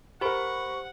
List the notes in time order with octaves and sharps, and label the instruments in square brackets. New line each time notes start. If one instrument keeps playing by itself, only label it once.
[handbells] G4 C5 [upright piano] A#4 B5 [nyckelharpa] F#5 [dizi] C#6